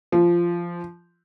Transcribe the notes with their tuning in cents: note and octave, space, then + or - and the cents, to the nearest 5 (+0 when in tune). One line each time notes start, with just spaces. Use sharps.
F3 -15